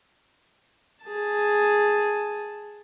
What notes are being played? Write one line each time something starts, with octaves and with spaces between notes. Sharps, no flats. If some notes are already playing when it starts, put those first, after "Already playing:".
G#4 A5